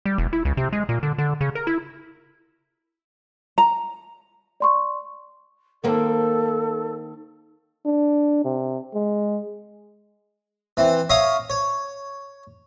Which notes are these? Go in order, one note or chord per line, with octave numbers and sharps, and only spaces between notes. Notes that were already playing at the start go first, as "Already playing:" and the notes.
G3
E1
E4
C#2
C3
G#3
A#2
D3
D3
C#3
A#4
E4
A#5
D5 C6 C#6
D#3 A#3 C4 A4
D4
C3
G#3
E3 C4
C#5 E5 F5 A#5 D#6
C#5